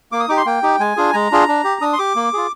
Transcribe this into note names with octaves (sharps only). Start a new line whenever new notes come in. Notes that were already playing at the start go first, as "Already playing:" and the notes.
A#3 D6
D#6
D#4 G4 D6
C6
A#3 G5
D#4 G4
G#3 G#5
D4 F4 G#4
G#3 A#5
D4 F4 G#4
D4
G4
D4 D#6
C6
G4 D6
A#3
F4 G#4